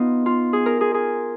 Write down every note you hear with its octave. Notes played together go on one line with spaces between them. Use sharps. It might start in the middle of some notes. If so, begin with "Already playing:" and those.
Already playing: B3 D#4 F4
F4
G#4
A#4
G#4
G#4